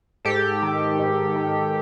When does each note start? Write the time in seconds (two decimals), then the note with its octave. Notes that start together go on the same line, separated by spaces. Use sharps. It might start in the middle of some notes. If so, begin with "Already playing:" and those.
0.25 G#2 G4 A4
0.62 D#3
0.99 G#2
1.36 D#3